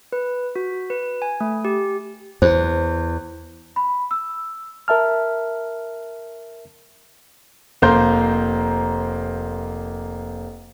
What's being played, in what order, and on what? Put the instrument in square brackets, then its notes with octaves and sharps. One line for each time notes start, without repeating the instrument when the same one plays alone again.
[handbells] B4
F#4
B4
G#5
A3
G4
[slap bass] E2 [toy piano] C5
[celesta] B5
E6
[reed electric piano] A#4 E5 A5 F6
[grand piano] F1 A#3 C5 A#5 C6 G6